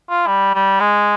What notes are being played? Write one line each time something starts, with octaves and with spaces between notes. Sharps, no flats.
F4
G3
G3
G#3